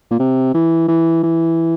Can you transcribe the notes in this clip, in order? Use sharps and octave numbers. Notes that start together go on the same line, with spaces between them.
A#2
C3
E3
E3
E3